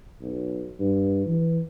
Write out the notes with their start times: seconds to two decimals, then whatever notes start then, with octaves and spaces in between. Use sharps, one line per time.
0.21 B1
0.79 G2
1.26 E3